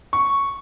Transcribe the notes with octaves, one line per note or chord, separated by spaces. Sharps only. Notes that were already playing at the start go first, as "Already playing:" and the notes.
C#6